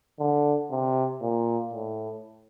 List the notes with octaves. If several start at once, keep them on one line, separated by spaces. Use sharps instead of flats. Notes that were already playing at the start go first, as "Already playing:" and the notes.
D3
C3
A#2
A2